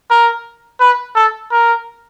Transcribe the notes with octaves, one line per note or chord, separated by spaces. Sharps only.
A#4
B4
A4
A#4